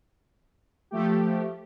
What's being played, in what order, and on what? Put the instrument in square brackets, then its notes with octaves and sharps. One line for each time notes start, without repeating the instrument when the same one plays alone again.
[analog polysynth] F3 A3 G4